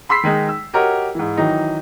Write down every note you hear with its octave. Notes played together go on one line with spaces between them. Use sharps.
B5 C6 E6 B6 C7
D#3 G#3 D#4
E6
F#4 G4 A#4 C#5 D#5 F#5
G#2 E3
D#3 E3 F#3 D#4